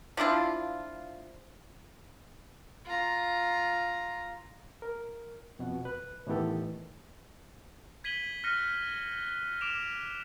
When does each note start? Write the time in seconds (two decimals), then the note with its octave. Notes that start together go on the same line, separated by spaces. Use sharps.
0.17 F3 D4 E4 F4
2.85 F4 A#5
4.82 A#4
5.59 F2 B2 F#5
5.85 B4 F#6
6.27 A2 D#3 E3 B3 G4 A4
8.04 G#6 B6 D#7 F#7 G7
8.44 F6 F#6 A#6 C#7 D#7 F#7
9.61 D6 D7 E7 F7